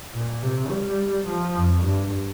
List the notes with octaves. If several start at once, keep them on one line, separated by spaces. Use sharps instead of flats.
A#2
C3
G3
F3
F2
G2